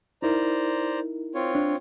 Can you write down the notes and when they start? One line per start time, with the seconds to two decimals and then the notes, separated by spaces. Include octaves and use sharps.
0.22 D#4 E4 A#4 C5 D5 A#5
1.35 C4 F4 C#5
1.55 D4